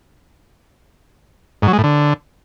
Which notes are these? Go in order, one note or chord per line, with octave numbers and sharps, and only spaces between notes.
G#2
F#3
G#3
A2
D3